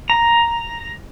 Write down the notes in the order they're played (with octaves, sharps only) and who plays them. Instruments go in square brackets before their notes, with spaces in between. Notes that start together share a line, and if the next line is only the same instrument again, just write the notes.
[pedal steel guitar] A#5